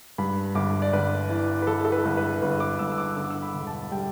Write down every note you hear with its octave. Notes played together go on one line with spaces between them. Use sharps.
G2 B5
G1 D6
D5
G1 B4
E3
B4
E3 A4
A4
B4
G1
B4
G1 B4
D6
G1 E6
E6
D6
D3 E6
D6
E6
B5
E1
A5
G3 G5